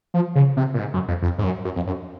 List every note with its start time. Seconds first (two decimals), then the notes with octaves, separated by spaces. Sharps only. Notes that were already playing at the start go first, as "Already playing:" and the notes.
0.14 F3
0.35 C#3
0.57 C3
0.74 A#2
0.79 G#2
0.94 F#2
1.08 F2
1.22 F2
1.38 G#2
1.44 F#2
1.65 F#2
1.76 F2
1.87 F#2